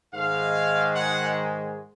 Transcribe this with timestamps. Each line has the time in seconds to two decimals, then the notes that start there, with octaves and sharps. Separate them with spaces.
0.14 G#2 D#3 G#3 F5
0.95 F#5